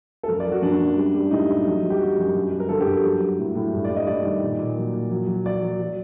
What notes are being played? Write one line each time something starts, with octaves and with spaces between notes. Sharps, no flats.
A4
F#2 A#4
D5
F#3
F#4
F#2 D4
F#2
G3
G3
A2 D#4
G3
F#3
F#3
G4
F#3 F#4
F#2
G2
G2
A#4
D3 A4
G4
G2
F#3
F#3
A2
A2
G2
D5
G2
D#5
G2 D5
D#3
A#2
A#2
F#3
A#2
F#3
F#3
F#3 D5
F#3
F#3